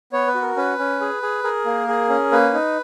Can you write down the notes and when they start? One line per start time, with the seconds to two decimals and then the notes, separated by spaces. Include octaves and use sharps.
0.12 B3 C#5
0.28 B4
0.35 F#4
0.42 A#4
0.56 C#4 B4
0.79 C#4
1.01 G#4
1.22 G#4
1.44 G#4 A#4
1.65 A#3
1.88 G#4
2.09 C#4
2.32 A#3 B4
2.54 D#4